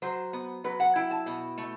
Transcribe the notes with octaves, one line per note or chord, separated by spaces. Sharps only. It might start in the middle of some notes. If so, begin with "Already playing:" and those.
F#3 C5
B3
F#3 B4
F#5
E4 G5
A5
B2
A3